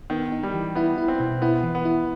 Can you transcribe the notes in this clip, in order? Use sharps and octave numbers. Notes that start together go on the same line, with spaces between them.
D#3 B3
D#4
G3
E3
B3 E4
E4
C4
B2
B3 E4
E3
B3
E4